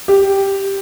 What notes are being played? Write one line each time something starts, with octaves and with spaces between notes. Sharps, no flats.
G4